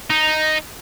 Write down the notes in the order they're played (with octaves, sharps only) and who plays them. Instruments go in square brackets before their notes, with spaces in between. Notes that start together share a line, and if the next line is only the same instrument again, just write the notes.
[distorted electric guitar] D#4